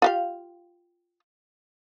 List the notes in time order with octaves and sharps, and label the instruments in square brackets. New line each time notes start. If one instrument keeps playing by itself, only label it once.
[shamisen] F4 G4 F5